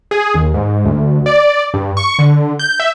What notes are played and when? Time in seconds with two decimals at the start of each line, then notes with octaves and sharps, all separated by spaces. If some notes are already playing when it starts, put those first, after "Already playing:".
0.11 G#4
0.34 D#2
0.54 G#2
0.85 D2
1.26 D5
1.74 G2
1.97 C#6
2.19 D3
2.59 G6
2.80 E5